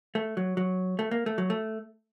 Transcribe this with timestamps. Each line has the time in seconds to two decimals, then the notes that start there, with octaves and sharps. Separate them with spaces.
0.15 A3
0.37 F#3
0.57 F#3
0.99 A3
1.11 A#3
1.26 A3
1.38 F#3
1.50 A3